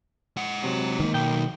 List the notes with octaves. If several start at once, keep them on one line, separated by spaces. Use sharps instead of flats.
G#3 F#5
C3 F#3
D#3 A#3
B1 G5